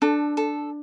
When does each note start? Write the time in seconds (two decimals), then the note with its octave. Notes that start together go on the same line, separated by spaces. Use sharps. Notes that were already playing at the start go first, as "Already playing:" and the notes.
0.02 D4 A4
0.37 A4